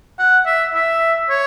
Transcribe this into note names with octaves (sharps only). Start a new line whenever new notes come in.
F#5
E5
E5
C#5